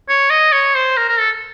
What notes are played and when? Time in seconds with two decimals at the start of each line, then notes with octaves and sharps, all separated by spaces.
0.09 C#5
0.30 D#5
0.52 C#5
0.75 C5
0.97 A#4
1.08 A#4
1.20 A4